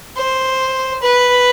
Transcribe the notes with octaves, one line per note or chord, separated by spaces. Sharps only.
C5
B4